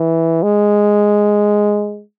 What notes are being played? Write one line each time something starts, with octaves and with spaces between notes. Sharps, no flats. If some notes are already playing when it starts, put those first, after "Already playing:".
Already playing: E3
G#3